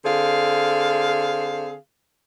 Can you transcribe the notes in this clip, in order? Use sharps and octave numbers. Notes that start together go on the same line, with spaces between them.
D3 C4 G#4 F5